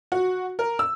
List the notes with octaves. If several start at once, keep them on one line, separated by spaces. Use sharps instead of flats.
F#4
A#4
E6